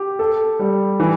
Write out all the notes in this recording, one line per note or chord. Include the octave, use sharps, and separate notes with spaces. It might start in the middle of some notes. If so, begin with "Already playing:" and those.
Already playing: G4
A4
G3
E3